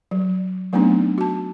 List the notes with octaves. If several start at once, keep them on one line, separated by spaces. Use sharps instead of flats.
F#3
F#3 A3 B3 C4 D4 D#4
F#4 A5